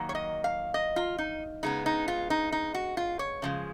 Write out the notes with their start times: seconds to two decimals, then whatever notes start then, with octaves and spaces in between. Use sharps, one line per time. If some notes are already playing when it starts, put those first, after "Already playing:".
Already playing: D#3 F#3 A#3
0.09 C#5
0.15 D#5
0.44 F5
0.74 D#5
0.96 F4
1.18 D#4
1.63 C#3 G#3 B3 D#4
1.86 D#4
2.08 F4
2.30 D#4
2.52 D#4
2.74 F#4
2.97 F4
3.19 C#5
3.42 C#3 F3 G#3